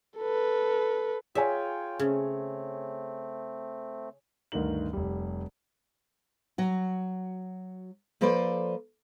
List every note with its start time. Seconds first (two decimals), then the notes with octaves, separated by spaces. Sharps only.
0.18 A4 B4
1.35 F4 G#4 C#5 E5 G5 G#5
1.99 C#3 A3 C4
4.52 D2 G2 D#3 A#4 F#7
4.93 F1 G3
6.58 F#3 F#4
8.21 F3 A#3 A4 B4 C5 D5